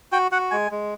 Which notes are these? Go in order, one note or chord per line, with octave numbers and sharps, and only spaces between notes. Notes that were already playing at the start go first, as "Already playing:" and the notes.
F#4 G5
F#4 F#5
G#3 G#5
G#3